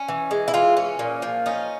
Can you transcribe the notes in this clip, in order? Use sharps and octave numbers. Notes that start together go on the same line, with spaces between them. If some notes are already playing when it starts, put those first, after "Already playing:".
Already playing: C#4
E3
G#3
E4
E3 F4
C#4
A#2
F3
C#4 D#4